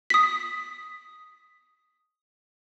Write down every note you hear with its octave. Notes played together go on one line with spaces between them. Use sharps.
D#6 B6